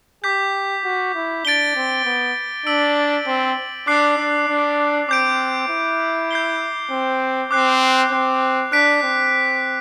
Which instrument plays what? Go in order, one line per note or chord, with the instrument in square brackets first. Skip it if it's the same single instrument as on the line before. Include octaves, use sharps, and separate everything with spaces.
[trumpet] G4 [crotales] D6 G6 B6
[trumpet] F#4
E4
[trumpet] D4 [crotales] A6 D7 G7
[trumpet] C4
B3
[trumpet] D4 [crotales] E6 B6 D7 F#7
[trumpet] C4
[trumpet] D4 [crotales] D6 F#6 C7
[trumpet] D4
D4
[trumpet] C4 [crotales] D6 G6 D7
[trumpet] E4
[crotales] G6 C7 G7
[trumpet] C4
[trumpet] C4 [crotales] D6 F#6 C7
[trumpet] C4
[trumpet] D4 [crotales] F#6 B6 D7
[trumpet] C4